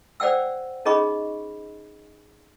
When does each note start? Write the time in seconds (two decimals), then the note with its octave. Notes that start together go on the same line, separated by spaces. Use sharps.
0.20 C5 D5 F#5 G5 E6
0.85 C#4 D#4 G#4 D#5 B5 C#6